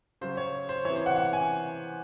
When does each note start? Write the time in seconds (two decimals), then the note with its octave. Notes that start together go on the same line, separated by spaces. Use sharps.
0.21 C#3 F#3 C5
0.37 C#5
0.69 C5
0.85 E3 C#5
0.89 C3
0.96 C5
1.06 F#5
1.16 F#5
1.33 G#5